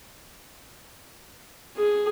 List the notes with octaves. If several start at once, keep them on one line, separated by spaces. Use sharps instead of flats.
G#4